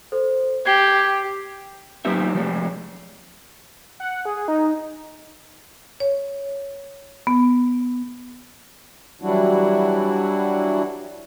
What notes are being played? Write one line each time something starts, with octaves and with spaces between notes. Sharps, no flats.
A4 C5
G4 G#6 C7 G7
F#3 A#3 B3 D#4 G4 E5
F3 G#3 A3
F#5
G#4
D#4
C#5
B3
E3 F#3 G3 D4 E4 F#4